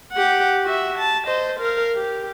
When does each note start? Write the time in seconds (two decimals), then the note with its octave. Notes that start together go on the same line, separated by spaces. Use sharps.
0.13 G4 F#5
0.65 F#4 E5
0.98 A5
1.27 C5 D#5
1.60 A#4 F5
1.96 G4